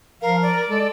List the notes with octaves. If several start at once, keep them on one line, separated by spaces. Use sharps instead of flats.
F3 A#4 F5
D5
G#3 A4